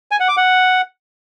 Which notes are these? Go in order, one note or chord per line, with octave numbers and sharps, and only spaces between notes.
G#5
F#5
D6
F#5